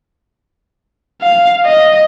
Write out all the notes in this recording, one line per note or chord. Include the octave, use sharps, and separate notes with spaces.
F5
D#5